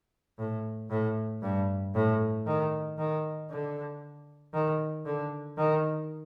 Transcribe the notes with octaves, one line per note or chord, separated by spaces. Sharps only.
A2
A2
G2
A2
D#3
D#3
D3
D#3
D3
D#3